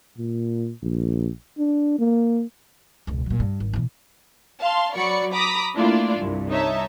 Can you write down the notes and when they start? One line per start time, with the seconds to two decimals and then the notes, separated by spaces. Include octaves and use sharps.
0.18 A#2
0.82 A#1
1.58 D4
1.99 A#3
3.07 E1 C#2
3.26 A#2 F#3
3.40 G2
3.60 G#1
3.73 B2 E3
4.60 F5 A5 C6
4.95 F#3 F#4 D5 B5 C#6 C#7
5.33 A#5 B5 D6 D#6 B6
5.76 A3 A#3 D4 E4 F4 D5
6.19 C2 G2
6.50 D#4 C#5 E5 A5